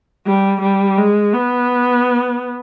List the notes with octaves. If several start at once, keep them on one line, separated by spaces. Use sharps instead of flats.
G3
G3
G#3
B3